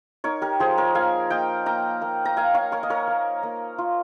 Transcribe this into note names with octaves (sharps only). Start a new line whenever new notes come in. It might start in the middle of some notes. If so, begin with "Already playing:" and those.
D#4 A#4 C#5
G4 A#4
F3 G#4 C5
A#4 C#5
A#3 F5 G#5
A#3 D#5 G5
A#3 G5 A#5
A#3
A#5
A#3 F5 G#5
C#5 F5
A#3 A#4 C#5
D#5
A#4 C#5
A#3
A#3
F4